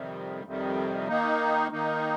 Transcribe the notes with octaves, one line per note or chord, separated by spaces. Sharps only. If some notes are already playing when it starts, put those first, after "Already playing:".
Already playing: F2 C3 D#3 G3
F2 C3 D#3 G3
D#3 A#3 D#4
D#3 A#3 D#4